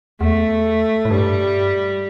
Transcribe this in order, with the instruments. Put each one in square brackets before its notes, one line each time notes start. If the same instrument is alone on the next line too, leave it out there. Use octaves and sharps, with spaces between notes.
[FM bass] E2 [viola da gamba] A3
[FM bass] A2
[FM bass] G2 [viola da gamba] G3